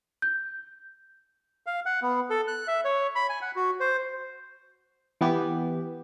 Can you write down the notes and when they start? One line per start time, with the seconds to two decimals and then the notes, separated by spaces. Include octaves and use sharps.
0.22 G6
1.66 F5
1.86 F#5
2.02 B3
2.30 A4
2.48 F#6
2.68 E5
2.85 C#5
3.15 B5
3.29 G#5
3.42 F#5
3.56 F#4
3.80 C5
5.21 E3 B3 G4